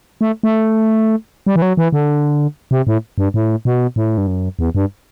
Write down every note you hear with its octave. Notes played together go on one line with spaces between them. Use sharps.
A3
A3
G3
E3
F#3
E3
D3
C3
A2
G2
A2
B2
A2
G2
F#2
E2
G2